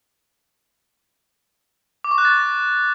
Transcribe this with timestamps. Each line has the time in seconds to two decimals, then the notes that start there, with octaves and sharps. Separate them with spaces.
2.04 D6
2.11 C#6
2.18 F#6
2.25 A6